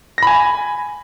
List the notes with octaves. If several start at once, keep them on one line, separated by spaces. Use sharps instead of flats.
G#5 B5 A#6